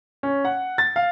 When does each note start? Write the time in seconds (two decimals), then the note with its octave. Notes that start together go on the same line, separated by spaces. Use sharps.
0.23 C#4
0.45 F#5
0.78 A6
0.96 F5